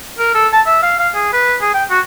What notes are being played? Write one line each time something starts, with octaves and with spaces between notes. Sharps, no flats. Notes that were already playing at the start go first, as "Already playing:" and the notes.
A#4
A4
A5
E5
F5
F5
G#4
B4
G#4
G5
F#4